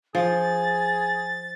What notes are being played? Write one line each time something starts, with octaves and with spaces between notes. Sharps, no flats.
F3 G#4 A6